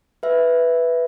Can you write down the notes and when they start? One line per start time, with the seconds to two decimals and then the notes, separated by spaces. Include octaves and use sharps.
0.23 B4 E5